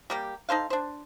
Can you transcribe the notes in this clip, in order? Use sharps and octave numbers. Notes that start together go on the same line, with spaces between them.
G3 A#3 G4
D#4 A4 C5 F5
D4 C5